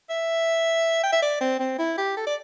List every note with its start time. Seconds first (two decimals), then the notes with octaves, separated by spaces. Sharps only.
0.10 E5
1.04 G5
1.13 E5
1.22 D5
1.41 C4
1.60 C4
1.79 E4
1.98 G4
2.17 A4
2.27 D5